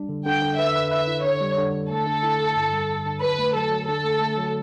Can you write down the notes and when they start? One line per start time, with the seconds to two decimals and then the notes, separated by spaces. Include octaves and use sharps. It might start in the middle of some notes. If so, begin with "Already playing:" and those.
Already playing: G3 D4
0.09 D3
0.26 D3 G5
0.42 D3
0.58 B4 E5
0.75 B4
0.91 B4 E5
1.08 E4
1.24 D3 C#5
1.41 G3
1.58 D3
1.74 D3
1.90 A3 A4
2.07 D3
2.23 E4
2.40 D3
2.57 G2
2.73 G3
2.89 D3
3.06 D3
3.22 F#3 B4
3.39 A3
3.55 F#3 A4
3.72 F#3
3.88 D3 A4
4.05 A3
4.21 A3
4.38 F#3